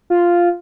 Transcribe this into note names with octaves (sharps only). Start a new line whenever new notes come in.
F4